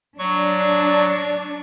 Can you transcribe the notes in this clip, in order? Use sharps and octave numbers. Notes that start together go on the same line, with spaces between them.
F#3 D4 C#6